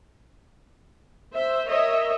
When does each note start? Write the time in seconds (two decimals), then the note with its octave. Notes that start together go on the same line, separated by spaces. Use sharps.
1.34 C5 E5
1.68 A#4 C#5 D#5 E5